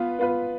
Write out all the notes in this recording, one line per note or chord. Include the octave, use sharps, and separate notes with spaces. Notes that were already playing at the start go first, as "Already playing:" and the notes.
Already playing: B3 F4 B4
B3 F4 B4